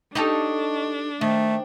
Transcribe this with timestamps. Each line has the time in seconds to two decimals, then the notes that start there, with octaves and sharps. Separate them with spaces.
0.15 D4 D#4 G4 A4 D#5 A5 C#6
1.21 D#3 A3 C5 G5